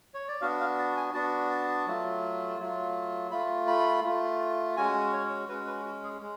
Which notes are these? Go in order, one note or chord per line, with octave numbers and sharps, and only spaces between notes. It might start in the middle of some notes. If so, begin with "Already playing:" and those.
C#5
D5
B3 D4 F#4 F5
F5
A5
G#5
B3 D4 F#4 A5
A5
F#3 A3 F4
F#3 A3 F4
A3 F4 B5
B5
A3 F4
G#3 C#4 F#4 G#5
C#5
G#3 C#4 F#4 B4
B4
F#4
G#4
G#3